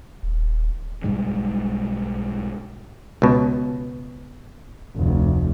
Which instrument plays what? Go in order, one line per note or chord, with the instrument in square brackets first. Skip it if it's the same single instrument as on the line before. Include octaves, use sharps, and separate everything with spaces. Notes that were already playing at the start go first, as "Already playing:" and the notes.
[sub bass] D#1
[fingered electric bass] B1 G#2 G3 G#3
[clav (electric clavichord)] C#2 B2
[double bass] F1 D2